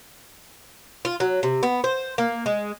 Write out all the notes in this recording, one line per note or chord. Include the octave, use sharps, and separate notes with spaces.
F4
F#3
C3
B3
C5
A#3
G#3